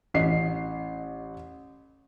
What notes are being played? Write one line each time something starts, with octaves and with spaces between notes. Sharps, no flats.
A1 D#5 C7